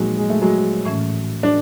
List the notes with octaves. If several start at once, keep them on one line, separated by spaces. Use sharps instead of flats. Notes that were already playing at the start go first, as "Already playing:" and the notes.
Already playing: A#2 F3 F#3 G#3 A#3 D#4
G#3
A3
F#3 G#3
A2 E3 A3 C#4
D4